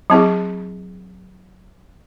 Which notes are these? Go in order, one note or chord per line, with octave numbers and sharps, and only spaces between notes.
F#3 C4 E4 G#4